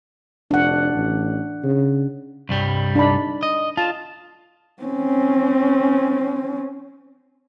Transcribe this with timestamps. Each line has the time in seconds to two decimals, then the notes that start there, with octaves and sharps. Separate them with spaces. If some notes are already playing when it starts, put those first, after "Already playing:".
0.51 F1 D4 F#5
0.93 A1
1.64 C#3
2.49 C2 G2 G3
2.95 D4 D#4 B5
3.43 D#5
3.77 F4 A5
4.83 C4 C#4